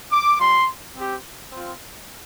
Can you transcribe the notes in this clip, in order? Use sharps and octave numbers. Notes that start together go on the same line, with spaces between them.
D6
G3 F4 C6
C4 G4
C4 F4